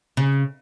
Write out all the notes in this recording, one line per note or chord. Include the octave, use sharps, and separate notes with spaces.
C#3